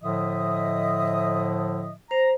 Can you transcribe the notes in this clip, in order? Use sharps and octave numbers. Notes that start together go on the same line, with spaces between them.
A2 D3 F3 D#5 E5 D#6
C5 A#5